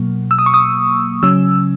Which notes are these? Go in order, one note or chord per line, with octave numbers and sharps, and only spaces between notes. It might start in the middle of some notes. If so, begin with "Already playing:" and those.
Already playing: B2 F#3 A#3
E6
D#6
C#6
D#6
C#3 F#3 C#4 E6